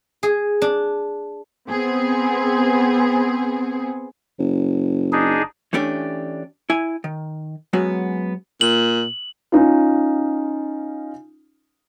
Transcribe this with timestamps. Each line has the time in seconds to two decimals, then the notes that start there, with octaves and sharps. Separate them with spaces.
0.23 G#4
0.62 D4
1.70 B3 C4 G#4
4.39 F#1
5.12 D4 D#4 G#4
5.73 E3 A3 C#4 D4 G4
6.70 E4 G#5
7.04 D#3
7.73 F#3 G#3 B3 C#4 F#4
8.61 A#2 F#7
9.52 C#4 D#4 F4